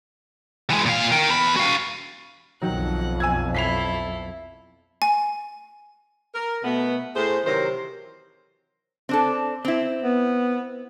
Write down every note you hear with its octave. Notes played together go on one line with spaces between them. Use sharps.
E3 G#3
A#2 F5
A#4 G5
E2 B5
F#4 F5
B1 F2 D#3 F#3 F#5
G#5 E6 G#6
E4 A4 B6 C7 F7
G#5
A#4
B2 A3 B3
A2 A3 G#4 C5
C3 D#3 E3 F#3 A#4 C5
C4 D4 A4
C4 E4
B3